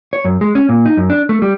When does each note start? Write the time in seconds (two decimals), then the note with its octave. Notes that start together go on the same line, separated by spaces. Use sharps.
0.13 C#5
0.25 F#2
0.41 G#3
0.55 C#4
0.69 A#2
0.86 D#4
0.97 F#2
1.10 D4
1.29 A3
1.42 G3